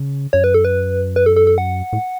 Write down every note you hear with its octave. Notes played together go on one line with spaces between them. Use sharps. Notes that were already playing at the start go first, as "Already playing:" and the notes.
Already playing: C#3
F#2 C#5
B4
A4
B4
B4
A4
A4
A4
F#5
A2